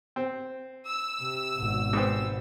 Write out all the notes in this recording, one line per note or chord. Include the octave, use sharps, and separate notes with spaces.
C4
E6
C3
G#1 B2
G#2 B3 C4